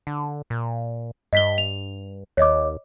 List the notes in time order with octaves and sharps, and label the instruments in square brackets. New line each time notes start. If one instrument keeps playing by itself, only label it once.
[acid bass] D3
A#2
[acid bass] G2 [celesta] D#5 B6 G7
[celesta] F7
[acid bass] D#2 [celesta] C#5 D#5 D6